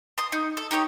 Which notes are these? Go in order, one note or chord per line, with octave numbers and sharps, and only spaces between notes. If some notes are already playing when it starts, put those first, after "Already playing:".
C6 D#6
D#4
A4
D#4 G4 C5 C#5